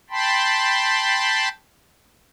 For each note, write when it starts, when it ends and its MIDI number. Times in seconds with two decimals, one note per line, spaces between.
0.10 1.49 79
0.10 1.49 81
0.10 1.49 83
0.10 1.49 84